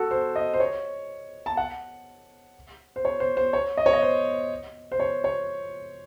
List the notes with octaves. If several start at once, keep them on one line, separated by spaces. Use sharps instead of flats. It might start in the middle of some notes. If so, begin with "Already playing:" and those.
Already playing: F#4 A4
C5
D#5
C5
C#5
A5
F#5
C5
C#5
C5
C5
C#5
D#5
C#5
D#5
C5
C5
C#5
C#5